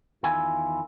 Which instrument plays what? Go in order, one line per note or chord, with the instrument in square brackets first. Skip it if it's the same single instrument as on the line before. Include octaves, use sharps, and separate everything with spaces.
[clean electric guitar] E2 D#3 E4 F4 G#5